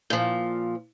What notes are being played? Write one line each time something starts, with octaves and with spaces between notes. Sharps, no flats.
A#2 F3